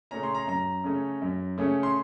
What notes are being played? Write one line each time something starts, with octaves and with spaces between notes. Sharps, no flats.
C#3 A3 C#4 A#5
C6
A#5
F#2 A#5
C#3 A3 C#4
F#2
C#3 A3 C#4
C6